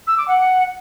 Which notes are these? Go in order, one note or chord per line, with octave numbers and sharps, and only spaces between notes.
E6
D6
F#5